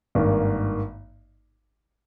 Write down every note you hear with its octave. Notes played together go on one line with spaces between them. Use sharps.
G#1 G2 D#3 A#3